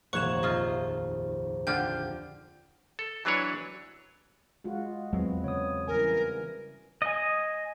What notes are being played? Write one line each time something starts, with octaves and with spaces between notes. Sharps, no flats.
F1 A#1 D#2 C#5 F#5 C#6 E7
C3 F4 D#5
D3 F4 G4 G5 G6
A4
E3 F#3 D4 B4 C#5
G#3 F4 F#4
E2 F#3 G#3 B3 C4
C#3 C#5 D#6
C#3 E3 G3 A#4 G#5
D#5 G#5